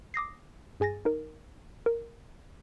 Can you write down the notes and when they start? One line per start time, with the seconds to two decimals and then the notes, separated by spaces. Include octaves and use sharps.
0.14 D6 D#6 A#6 C7
0.80 G2 G#4 G#5 A6 A#6
1.05 D#4 A#4
1.86 A#4